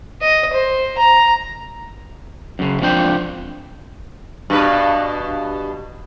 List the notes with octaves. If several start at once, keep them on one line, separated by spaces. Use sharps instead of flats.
D#5
C5
A#5
F#2 C#3
F3 C4 D4 G5
G2 B2 B4